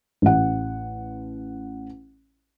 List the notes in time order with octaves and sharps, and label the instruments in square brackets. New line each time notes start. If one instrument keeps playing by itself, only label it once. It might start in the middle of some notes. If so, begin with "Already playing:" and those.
[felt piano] A1 F#5